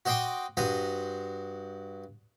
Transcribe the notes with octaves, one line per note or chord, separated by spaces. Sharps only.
F#4 C5 D#5 G5 C6 D6
G2 F#4 C5 A#5 D#6